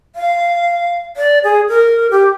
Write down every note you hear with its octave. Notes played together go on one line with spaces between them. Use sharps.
F5
D5
G#4
A#4
G4